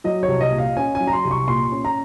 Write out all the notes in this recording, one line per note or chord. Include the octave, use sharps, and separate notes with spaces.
F#3 D#5
C#5
C2
D#5
A#2
F5
C#4 G#5
F#3 G#5
A#5
C6
C2
C#6
A#2 C6
C#4
A#5